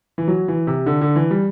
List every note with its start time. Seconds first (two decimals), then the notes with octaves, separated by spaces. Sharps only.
0.18 E3
0.28 F#3
0.48 E3
0.67 C3
0.86 D3
1.01 D3
1.16 E3
1.31 G3